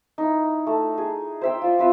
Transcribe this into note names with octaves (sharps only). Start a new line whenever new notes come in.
D#4 E4
A3
G#4
C5 E5 G5
F4 D5
C4 F4 B4 E5